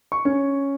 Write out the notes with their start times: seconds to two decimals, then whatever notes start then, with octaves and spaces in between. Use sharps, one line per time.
0.12 C#6
0.25 C#4